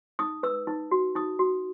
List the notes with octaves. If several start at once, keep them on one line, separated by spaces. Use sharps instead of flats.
D#4 D#6
B4 E6
D#4
F#4
D#4 D#6
F#4